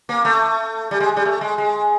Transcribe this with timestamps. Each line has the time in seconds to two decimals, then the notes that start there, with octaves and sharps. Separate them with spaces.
0.09 A#3
0.25 A3
0.91 G3
1.00 G#3
1.17 G3
1.25 A3
1.41 G#3
1.58 G#3